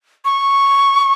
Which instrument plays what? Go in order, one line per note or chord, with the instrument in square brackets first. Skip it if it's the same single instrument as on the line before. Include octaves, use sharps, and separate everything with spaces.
[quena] C#6